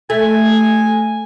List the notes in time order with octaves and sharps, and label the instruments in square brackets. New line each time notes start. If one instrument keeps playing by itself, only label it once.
[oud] A3 [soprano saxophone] G#5